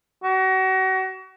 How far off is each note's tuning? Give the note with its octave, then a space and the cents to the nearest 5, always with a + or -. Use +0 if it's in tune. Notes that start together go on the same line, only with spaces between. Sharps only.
F#4 +35